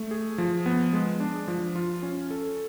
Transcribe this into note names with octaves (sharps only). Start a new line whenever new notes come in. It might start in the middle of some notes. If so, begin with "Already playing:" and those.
Already playing: A3
G#4
F3
B3
G#3
D4
F3
F4
C#4
A4